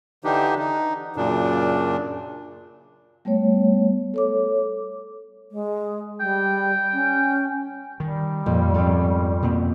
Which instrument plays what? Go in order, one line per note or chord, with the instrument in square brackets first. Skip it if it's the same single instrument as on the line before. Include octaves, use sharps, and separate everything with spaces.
[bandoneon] D3 E3 D4 D#4 G4
D#4
F#2 A#2 C#3 D4
[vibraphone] G3 A3 B3 C#5
A4 C#5 D6
[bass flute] G#3
[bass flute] G3 [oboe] G5
[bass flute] C#4
[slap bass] D#3 [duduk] G3
[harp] F2 [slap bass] A#2
[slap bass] G#2 C4 [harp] C#4 A4
[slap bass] B2 A#3 C4